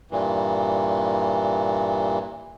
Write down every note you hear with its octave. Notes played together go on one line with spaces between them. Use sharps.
G2 A#2 E3